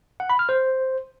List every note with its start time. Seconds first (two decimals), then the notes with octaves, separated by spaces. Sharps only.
0.20 F#5
0.30 B5
0.39 F6
0.49 C5